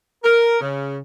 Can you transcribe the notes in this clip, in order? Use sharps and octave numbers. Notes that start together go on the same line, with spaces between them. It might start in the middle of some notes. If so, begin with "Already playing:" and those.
A#4
C#3